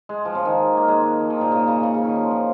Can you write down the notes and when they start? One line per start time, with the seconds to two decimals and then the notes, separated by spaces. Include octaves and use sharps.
0.09 G#3
0.25 F3
0.35 C#3
0.45 D#3
0.77 A#3
0.88 G#3
1.20 F3
1.30 D#3
1.41 A#2
1.52 C#3
1.68 C#3
1.83 C#3
1.94 C#3
2.05 D#3
2.15 F3
2.31 F3